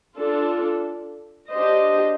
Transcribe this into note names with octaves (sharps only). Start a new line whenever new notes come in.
D4 F4 A4
D4 G4 C5 D#5